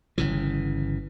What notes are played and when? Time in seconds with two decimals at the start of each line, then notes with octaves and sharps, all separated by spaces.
0.18 G1 C#3 E3